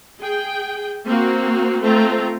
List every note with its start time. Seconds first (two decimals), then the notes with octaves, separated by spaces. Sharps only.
0.20 G#4 G5
1.07 A#3 C4 F#4
1.83 A3 C4 F4 A#5